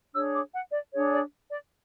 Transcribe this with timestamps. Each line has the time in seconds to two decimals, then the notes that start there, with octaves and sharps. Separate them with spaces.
0.13 D4 G#4 C#5 E6
0.33 D6
0.52 F#5
0.72 D5
0.92 D4 G#4 C#5
1.12 D5
1.51 D5